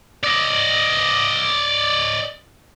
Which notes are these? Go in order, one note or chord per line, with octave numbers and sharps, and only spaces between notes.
D5 D#5